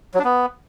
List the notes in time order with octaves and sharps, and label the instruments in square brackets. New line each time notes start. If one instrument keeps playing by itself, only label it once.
[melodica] F#3
D4
B3